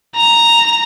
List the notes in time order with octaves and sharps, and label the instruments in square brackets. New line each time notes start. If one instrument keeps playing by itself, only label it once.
[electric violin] A#5